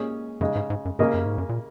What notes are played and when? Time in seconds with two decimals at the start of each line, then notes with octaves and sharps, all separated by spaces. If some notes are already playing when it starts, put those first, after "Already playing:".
Already playing: A#2 G#3 C#4 G#4 C#5
0.41 F#2 C#3 G#3 D#4
0.55 G#2
0.70 G#2
0.85 F#2
0.99 G#2 C#3 A#3 C#4 A#4 D#5
1.14 F#2
1.25 G#2
1.38 F#2
1.49 A#2